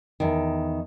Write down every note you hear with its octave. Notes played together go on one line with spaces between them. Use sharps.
E2 D#3